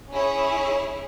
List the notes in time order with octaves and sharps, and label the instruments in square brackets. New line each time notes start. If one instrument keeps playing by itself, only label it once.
[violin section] C#4 E4 G#4 C#5